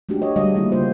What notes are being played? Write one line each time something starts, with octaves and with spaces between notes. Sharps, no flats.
G#3 A3 D4 F#4 G4
C#5 D#5
D3 G3 G#3 D#5 F5
D3 D#3 G3 A3 A#3 E4
C#3 A3 A#3 F4 C5